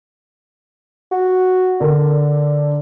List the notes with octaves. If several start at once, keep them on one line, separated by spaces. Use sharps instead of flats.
F#4
D3 D4 A#4